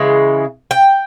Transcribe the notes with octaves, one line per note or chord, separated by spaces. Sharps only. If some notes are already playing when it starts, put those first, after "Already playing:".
Already playing: C#3 E3 G#3
G5